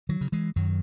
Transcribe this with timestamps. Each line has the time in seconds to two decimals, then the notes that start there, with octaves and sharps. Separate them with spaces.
0.09 D#3 F#3
0.21 C#3
0.32 E3 G#3
0.56 F#2 D#3 F#3